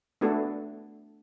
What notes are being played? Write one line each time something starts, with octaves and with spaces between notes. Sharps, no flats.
A3 B3 D4 F#4 A4